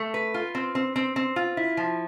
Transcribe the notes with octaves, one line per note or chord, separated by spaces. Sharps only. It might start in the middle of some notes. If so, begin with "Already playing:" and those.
Already playing: A3
B4
F4
C4
C4
C4
C4
F4
E4
F3